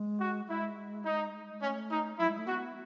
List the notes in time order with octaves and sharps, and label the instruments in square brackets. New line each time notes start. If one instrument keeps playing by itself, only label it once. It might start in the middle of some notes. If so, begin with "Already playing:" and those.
Already playing: [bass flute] G#3
[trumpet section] F#4
[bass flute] G#3 [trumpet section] E4
[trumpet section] D#4
[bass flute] A3 [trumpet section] C#4
[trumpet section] D#4
[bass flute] F#3 [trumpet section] E4
[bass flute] G#3
A3
[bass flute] B3 [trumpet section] F#4